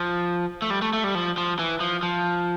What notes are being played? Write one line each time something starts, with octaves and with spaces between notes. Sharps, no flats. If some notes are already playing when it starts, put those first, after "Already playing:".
Already playing: F3
A3
G3
A3
A3
G3
F3
F3
E3
F3
F3